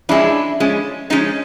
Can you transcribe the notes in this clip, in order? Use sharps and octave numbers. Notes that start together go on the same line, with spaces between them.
F3 G#3 C#4 D4 E4
F3 G#3 C#4
F3 G#3 C#4 D#4